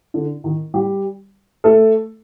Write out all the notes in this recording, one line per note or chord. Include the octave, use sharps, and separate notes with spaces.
D3 D4
D#3 D#4
G3 G4
A3 A4